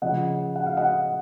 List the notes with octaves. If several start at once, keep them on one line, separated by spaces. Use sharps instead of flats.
C#3 F3 D#5 F#5
F#5
F5
D#5 F#5